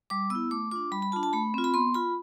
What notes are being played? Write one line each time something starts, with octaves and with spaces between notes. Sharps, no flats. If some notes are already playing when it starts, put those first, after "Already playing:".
G3 D6
B3 E4 E6
A3 D6
D4 F4 D6
G3 B5
B5
D4 F4 A5
A5
A3 B5
C4 F4
B5
B3 C6
F4 B5